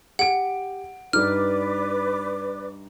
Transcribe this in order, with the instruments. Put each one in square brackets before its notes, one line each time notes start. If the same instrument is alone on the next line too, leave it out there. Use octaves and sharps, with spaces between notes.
[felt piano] G4 D7 [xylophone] F#5
[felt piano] G2 G3 D#4 [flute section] B4 D5 D6 [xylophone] F6